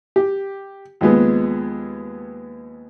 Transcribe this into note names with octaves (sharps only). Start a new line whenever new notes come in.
G4
D#2 F3 G#3 B3